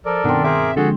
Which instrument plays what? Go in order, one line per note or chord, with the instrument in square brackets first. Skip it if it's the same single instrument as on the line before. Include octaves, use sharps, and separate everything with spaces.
[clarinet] F3 [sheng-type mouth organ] A4 A#4 D5
[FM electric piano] G2 B2 D#3 [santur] B3 C4 [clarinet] D4
[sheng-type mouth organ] G#4 A#4 D6 [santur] C5 [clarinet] E5
[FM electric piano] D3 F3 G#3 [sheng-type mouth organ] F#4 G#4 [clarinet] A4